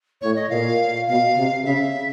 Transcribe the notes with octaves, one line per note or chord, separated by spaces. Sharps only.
A2 C#5
D#5
A#2 F5
B2 F5
C3
C#3 E5